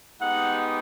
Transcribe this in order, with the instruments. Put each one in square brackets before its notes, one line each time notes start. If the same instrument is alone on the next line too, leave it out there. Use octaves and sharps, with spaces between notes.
[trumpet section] G#3 B3 D#4 G4 F#5